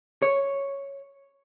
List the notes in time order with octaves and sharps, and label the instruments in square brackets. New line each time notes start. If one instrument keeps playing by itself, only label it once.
[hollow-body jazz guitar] C#5